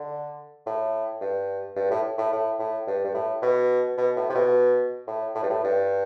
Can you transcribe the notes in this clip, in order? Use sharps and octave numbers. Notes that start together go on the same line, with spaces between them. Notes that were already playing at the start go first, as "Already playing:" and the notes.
Already playing: D3
A2
G2
G2
A2
A2
A2
A2
G2
G2
A2
B2
B2
A2
C3
B2
A2
A2
G2
A2
G2